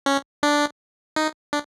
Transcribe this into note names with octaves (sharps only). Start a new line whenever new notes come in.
C#4
D4
D#4
D4